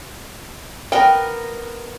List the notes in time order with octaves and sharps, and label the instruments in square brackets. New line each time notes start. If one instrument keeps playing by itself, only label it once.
[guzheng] B3 A#4 [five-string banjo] G5